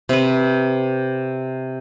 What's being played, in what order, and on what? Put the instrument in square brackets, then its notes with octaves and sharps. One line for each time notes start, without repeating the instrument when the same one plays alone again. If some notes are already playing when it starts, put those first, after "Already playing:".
[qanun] C3 B4